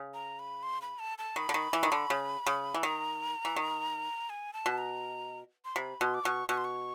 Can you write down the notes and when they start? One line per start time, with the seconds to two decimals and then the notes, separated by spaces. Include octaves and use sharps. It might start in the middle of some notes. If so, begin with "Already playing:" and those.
Already playing: C#3
0.14 A#5
0.39 B5
0.63 C6
0.82 B5
0.99 A5
1.18 A5
1.36 D#3 B5
1.49 D3
1.54 D#3
1.73 E3
1.83 D#3
1.92 D3
2.10 C#3
2.47 C#3
2.74 E3
2.83 D#3 A#5
3.45 E3
3.56 D#3
4.30 G#5
4.53 A5
4.66 B2
4.78 A#5
5.65 C6
5.76 C3 B5
6.00 B2 C6
6.14 D6
6.24 B2 C#6
6.49 B2 C#6
6.57 C6
6.65 C#6